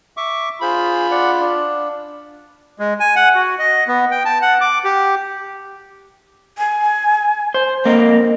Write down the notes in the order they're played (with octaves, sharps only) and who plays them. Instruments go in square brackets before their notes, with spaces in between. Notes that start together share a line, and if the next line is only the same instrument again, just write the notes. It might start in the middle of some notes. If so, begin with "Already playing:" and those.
[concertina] E5 C#6 D6
[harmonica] F4 B5 [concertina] G#4 C5
[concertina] D5 F#5
D4
G#3
G#5
F#5
F#4
D#5
B3
G5
A5
F#5
D6
G4
[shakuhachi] G#5
[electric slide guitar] C5
[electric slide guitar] A#3 C4 [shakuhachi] D#5